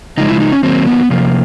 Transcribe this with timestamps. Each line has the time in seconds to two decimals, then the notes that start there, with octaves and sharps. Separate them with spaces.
0.17 C#3 F3 G#3 D#4
0.29 E4
0.40 D#4
0.52 C#4
0.63 D#3 F#3 A#3 C4
0.86 B3
1.10 C3 F3 A#3